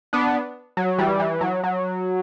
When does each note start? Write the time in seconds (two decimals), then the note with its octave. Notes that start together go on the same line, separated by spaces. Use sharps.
0.13 B3 D4
0.77 F#3
0.98 E3 G3
1.19 E3
1.41 F#3
1.64 F#3